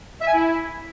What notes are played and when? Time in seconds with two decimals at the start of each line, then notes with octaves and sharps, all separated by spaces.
0.21 E5
0.27 G#5
0.34 E4